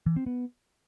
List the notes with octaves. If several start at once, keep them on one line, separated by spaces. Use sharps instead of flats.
E3
C4
B3